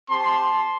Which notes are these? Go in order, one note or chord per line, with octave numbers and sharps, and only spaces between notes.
C4 G4 A5 C6